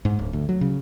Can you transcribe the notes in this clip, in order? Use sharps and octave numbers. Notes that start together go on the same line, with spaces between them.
G#2
D1
D2
F#3
C#3